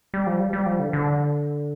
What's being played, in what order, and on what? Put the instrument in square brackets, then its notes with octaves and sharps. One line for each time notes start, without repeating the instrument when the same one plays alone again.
[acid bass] G3
F3
G3
G3
F3
D3
D3